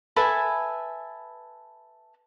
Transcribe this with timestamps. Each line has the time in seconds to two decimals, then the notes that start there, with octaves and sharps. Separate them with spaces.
0.16 A4 B4 E5 G#5